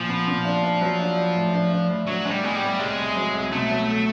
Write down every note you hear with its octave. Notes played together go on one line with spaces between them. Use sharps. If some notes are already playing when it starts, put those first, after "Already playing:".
Already playing: A#2 F3
B3
A#2
D4
D4
F#3
D4
D4
A2
D4
D4
A2
F#3 D4
G#3 D4
G3
G#3 B3
G3
A2
C2 G#3
C2
F#3
C2
B2 A3
F#3